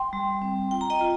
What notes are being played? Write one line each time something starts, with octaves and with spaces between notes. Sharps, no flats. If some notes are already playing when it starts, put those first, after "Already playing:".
Already playing: G5 C6
G3
C4
F4 G5
A#5
D#5 G5
F4